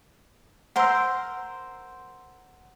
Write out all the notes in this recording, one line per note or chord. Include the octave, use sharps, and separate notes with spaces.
A#4 C5 F#5 C6 E6